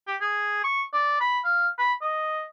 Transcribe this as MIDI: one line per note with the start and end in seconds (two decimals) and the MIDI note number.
0.07 0.16 67
0.21 0.63 68
0.64 0.82 85
0.93 1.17 74
1.21 1.39 83
1.44 1.68 77
1.79 1.93 83
2.01 2.43 75